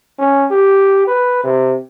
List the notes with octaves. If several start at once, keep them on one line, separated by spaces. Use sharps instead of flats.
C#4
G4
B4
C3